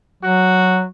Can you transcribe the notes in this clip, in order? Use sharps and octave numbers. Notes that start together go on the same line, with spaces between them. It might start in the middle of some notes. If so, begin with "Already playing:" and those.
F#3 F#4